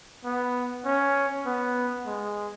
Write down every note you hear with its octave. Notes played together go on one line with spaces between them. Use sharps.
B3
C#4
B3
G#3